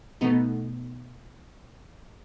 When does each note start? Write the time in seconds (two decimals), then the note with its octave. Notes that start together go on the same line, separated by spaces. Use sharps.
0.21 B2 A3 B3 D#4